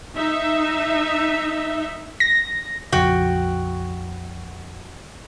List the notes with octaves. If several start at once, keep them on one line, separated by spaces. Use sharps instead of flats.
D#4 E5
A#6
A#1 F2 C#3 F#4 G5